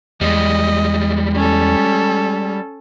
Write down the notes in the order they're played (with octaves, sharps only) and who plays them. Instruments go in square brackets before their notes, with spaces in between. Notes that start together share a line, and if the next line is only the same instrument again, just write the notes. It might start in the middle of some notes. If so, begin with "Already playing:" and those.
[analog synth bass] E2 [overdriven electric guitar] G3 G#3 [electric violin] D#5
[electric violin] C#4 A4